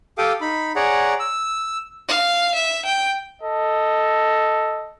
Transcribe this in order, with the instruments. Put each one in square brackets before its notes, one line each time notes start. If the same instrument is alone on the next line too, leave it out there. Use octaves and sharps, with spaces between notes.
[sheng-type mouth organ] G4 A4 F5 G5 D6 D#6
D#4 B5
G#4 C#5 D5 F#5 A#5
E6
[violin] F5
E5
G5
[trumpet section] A4 D#5